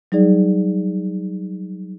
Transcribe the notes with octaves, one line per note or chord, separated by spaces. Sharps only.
F#3 G3 D#4 G#4 D5